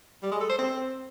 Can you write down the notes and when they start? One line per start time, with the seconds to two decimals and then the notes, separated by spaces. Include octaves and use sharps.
0.23 G3
0.32 G#3
0.41 A4
0.49 C5
0.58 C4